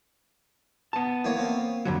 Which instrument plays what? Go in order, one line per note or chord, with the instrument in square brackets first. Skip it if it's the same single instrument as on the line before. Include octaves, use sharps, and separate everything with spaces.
[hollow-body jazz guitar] B3 A5
[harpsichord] E3 A#3 C#5
A#3 C4 A#4
[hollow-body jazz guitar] F2 D3 F#3